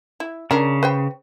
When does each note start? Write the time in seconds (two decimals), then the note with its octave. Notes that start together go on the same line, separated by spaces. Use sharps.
0.20 E4
0.51 C#3 C#4 D4 A#4
0.83 B4 C5 G5